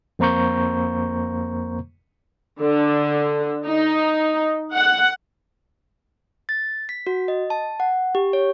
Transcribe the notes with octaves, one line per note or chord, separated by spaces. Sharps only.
F2 A#3 C5 A#5 C#6 G6
D3
D#4
F#5
A6
B6
F#4
D#5
A5
F#5
G4
C#5